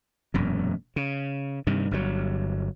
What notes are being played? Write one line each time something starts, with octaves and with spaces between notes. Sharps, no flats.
E1 F#2 A#2
C#3
G2 C3 D#3
G1 G2 D3 F#3